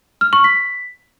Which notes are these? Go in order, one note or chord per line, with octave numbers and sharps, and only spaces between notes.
F6
C#6
B6